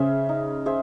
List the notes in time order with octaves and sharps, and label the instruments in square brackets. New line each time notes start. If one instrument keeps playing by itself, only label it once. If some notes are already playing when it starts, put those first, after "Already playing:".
Already playing: [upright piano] C#3 [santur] G#4 C5 E5
[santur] D#4
G#4 C5 E5